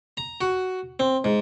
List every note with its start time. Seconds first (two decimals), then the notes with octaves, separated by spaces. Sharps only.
0.17 A#5
0.41 F#4
1.00 C4
1.24 G#2